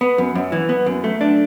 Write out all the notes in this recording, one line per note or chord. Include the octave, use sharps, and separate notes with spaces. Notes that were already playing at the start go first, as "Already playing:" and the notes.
B3
F#2
F#2
E3
B3
F#2
A3
D4